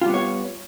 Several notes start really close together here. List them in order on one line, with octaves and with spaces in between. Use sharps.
F4 G3 B3 C#5